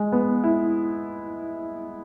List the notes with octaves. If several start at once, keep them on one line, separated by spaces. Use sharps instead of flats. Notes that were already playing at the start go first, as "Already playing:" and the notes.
Already playing: G#3
B3
E4